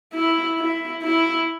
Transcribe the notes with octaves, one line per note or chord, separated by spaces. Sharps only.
E4
E4
E4